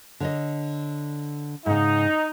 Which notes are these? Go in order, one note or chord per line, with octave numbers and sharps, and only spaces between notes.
D3 C#5 D#5
G#2 C#3 D#4